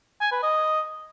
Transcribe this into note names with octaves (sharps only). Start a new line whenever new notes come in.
G#5
B4
D#5